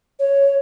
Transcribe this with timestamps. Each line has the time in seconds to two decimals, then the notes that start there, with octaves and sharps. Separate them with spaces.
0.19 C#5